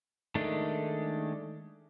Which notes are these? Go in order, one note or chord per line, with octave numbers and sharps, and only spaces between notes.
D#3 G#3 A3 D4